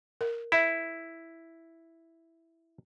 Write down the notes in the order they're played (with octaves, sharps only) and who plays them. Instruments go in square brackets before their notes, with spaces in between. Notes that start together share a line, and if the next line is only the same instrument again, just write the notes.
[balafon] A#4
[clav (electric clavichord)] E4 [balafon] E5 B5